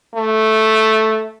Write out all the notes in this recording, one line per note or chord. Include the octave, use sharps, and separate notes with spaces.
A3